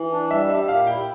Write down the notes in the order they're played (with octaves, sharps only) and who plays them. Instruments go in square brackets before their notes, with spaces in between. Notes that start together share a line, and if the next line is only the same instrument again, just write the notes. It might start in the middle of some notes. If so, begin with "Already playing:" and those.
Already playing: [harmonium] E3
D4
[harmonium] G3 [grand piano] E5
[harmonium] G4 [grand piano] E5
[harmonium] A#2 [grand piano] F5
[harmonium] E4 [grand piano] G5